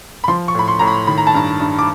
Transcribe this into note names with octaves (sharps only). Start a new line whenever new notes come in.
B5
F3 C6
C#6
A2 B5
C6
A2 A#5
B5
D#3 B5
A#5
A5
G2 A#5
G2
D6